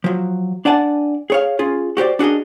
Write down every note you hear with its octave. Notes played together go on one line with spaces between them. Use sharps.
F3 F#3
D4 D5 F#5 G#5 A5
G#4 C#5 F5
C#4 F4 G#4
F#4 G4 C5 D5
D4 F#4 G#4 A#4 D#5